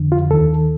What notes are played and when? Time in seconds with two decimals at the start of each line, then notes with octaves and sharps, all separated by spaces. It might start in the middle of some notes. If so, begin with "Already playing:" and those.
Already playing: F2 D3
0.12 F4
0.30 D#2 D#3 A4